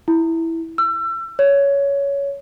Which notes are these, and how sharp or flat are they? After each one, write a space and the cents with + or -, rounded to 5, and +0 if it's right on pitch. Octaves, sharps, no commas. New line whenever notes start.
E4 -5
E6 +35
C#5 +15